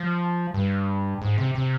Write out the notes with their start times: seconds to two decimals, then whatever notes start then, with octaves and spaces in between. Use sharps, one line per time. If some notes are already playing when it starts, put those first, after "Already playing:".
Already playing: F3
0.54 G2
1.22 G#2
1.38 C3
1.55 C3